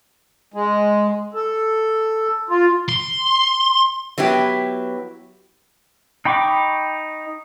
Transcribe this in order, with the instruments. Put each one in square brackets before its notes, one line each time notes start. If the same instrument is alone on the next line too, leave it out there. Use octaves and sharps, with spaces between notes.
[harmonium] G#3
A4
F4
[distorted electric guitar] C6
[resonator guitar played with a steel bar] F#3 B3 E4 G4
[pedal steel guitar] D#4 G5 B5 C#6 D6